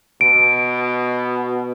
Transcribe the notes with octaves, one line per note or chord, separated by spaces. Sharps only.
B2 D7